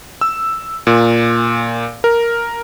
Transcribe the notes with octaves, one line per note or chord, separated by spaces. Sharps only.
E6
A#2
A#4